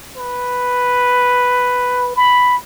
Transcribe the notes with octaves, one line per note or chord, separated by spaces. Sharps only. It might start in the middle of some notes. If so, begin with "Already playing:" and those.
B4
B5